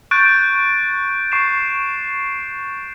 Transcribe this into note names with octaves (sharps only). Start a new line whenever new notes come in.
C#6 F#6 G6 A6 D7
C#6 C7 E7